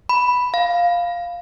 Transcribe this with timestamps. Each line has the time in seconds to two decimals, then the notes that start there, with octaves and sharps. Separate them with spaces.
0.09 B5
0.54 F5